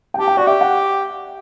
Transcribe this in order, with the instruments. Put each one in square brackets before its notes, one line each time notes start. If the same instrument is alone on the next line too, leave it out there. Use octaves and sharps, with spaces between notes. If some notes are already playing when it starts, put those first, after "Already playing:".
[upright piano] G5
[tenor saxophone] G4 [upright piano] A5
[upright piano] G5
[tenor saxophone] F#4 [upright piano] D5
[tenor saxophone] G4 [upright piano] E5
[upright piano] F#5